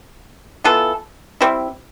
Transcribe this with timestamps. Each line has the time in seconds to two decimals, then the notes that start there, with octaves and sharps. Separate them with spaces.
0.64 E3 B3 F4 A4
1.41 G3 C4 E4